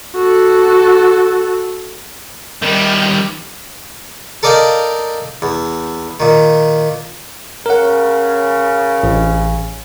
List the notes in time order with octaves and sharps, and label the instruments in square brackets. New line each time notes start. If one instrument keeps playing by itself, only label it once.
[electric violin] F#4 A4
[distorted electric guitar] D#3 G3
[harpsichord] A4 A#4 D5 D#5 F5 G5
E2
A#2 D#3
[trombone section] C#3 C#4 [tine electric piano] A#4 F#5
[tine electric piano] A1